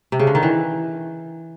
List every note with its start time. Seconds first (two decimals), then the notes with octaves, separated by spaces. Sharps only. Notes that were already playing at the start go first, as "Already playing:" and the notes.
0.12 C3
0.20 C#3
0.27 D3
0.35 D#3
0.43 E3